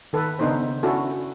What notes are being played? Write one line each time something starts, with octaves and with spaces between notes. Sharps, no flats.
D#3 A4 B4
C#3 B3 D4 D#4 A4 C5
C#4 D4 E4 F#4 A4